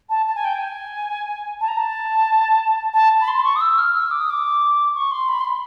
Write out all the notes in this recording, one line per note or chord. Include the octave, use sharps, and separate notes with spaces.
A5
A5
G#5
G5
G#5
A5
A#5
A5
A5
B5
C6
C6
C#6
D#6
E6
F6
E6
D6
D#6
D6
C#6
C6
B5
C6
B5